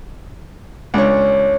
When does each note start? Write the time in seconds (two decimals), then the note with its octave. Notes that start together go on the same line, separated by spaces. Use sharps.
0.94 C#2 D4 C#5